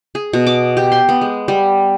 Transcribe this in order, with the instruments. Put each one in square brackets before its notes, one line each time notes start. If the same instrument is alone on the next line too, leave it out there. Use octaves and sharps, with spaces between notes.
[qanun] G#4
B2
D6
G4
C6
B3
G#3
G3